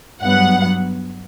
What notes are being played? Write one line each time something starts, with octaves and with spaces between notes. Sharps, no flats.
G2 F#3 B3 F#5